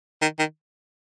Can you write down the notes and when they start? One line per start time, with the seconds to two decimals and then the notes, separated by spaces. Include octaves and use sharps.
0.21 D#3
0.39 D#3